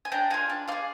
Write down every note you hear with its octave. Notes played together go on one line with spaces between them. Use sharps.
G#5
D4 G5 A#5
F4 G#4 F5 G#5
D4
F4 G#4 D5 F5